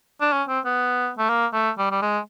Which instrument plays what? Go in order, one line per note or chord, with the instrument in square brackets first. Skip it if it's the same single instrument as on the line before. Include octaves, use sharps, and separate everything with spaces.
[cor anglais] D4
C#4
C4
B3
A3
A#3
A3
G3
G3
G#3